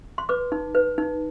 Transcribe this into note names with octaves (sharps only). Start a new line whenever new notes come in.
C6
B4 D6
D#4
B4
D#4